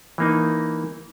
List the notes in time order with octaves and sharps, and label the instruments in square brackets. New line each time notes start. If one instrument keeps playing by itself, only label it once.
[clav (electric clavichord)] E3 A#3 D#4